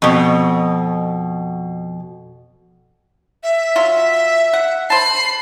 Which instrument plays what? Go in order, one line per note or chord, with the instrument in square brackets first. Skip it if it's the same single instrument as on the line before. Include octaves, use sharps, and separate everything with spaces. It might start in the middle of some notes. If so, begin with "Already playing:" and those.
[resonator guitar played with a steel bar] F2 B2
[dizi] E5
[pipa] F#3 F4
F#5
[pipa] C5 A5 [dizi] B5 [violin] C7